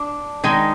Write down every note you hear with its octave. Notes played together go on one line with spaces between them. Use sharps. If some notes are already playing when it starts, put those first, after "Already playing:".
Already playing: D4
D#3 G#3 D#4